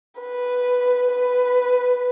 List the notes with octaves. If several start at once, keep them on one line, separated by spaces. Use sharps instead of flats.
B4
B4